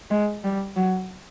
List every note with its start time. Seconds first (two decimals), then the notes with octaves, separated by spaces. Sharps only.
0.11 G#3
0.44 G3
0.76 F#3